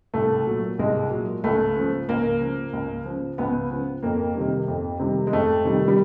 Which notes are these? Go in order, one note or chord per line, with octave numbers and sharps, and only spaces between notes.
C2 A3
A#2 F#3
C2 G#3
A#2 F#3
C#2 A3
C#3 F3
C#2 A#3
C#3 F3
C#2
C#3 F3
C#2 B3
C#3 F3
F2 A#3
C3 D#3 G3
F2
C3 D#3 G3
G#3
F2 A3
C3 D#3 G3
G3